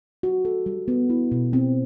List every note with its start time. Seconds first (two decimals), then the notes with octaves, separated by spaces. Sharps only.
0.23 F#4
0.45 A4
0.66 G3
0.88 B3
1.10 E4
1.32 B2
1.53 C4